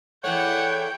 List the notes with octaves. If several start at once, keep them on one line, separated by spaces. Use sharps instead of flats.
E2 E3 A3 C#5 F#5 G5